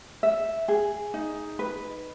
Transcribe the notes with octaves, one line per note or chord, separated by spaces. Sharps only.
E5
G#4
D#4
B4